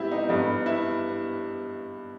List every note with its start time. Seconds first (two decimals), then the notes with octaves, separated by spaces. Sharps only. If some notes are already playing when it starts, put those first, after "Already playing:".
Already playing: G#2 G3 B3 E4 G4
0.11 D#4
0.29 G2 G3 B3 D#4
0.66 E4